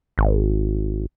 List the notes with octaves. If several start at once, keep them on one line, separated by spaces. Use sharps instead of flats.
G#1